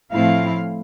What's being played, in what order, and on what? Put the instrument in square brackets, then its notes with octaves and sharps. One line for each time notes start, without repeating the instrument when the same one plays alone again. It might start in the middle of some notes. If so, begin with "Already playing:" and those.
[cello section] A2 F3 A3 C4 E4 F5